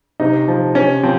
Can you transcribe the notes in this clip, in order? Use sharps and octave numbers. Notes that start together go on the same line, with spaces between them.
C3 D#4
F3
C3 C#4
F3 C4